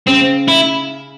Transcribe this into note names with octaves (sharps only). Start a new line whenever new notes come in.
C#3 C4
E4